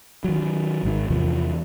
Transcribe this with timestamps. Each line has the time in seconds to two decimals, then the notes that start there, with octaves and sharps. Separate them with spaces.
0.24 D#3 F#3
0.83 G#1 G#2 D#3
1.10 E2 C3 E3 F3